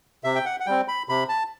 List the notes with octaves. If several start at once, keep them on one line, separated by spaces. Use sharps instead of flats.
C3 E5
G5
F#5
F#5
G3 C4 G5
B5
C3 B5
A5